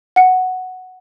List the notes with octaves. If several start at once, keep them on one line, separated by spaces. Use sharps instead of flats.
F#5 C#7